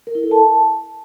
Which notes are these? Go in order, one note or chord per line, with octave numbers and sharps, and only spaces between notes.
A#4
E4
A4
A5